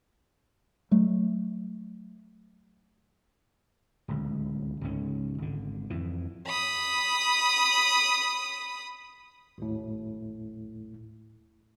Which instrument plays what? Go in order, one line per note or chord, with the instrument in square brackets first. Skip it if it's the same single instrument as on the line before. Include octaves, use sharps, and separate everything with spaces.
[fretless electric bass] F#3 A3
[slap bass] D1 C#2
C#2 G#2 C#4
G#1 D3
F2 E3
[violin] B5 D#6
[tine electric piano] G#1 D#2 A2